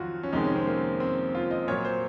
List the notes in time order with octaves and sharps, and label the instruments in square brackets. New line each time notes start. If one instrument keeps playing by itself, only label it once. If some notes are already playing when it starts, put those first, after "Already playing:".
Already playing: [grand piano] F2 D#3 F#3 F4 F#4
C#4
F2 C3 D#3 G#3 D#4
C#4
C4
A#3
C4
F4
D#5
A#2 F#3 C#5
C5